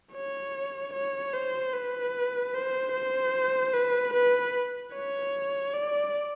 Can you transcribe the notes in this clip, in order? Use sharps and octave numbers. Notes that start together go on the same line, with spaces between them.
C#5
C#5
C5
B4
C5
C5
B4
B4
C#5
D5